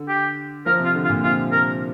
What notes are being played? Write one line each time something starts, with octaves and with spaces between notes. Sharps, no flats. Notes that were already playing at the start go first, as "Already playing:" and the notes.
Already playing: D3
G4
F3 A#4
C3
F4
D3
F4
A#2
C3 F4
A#4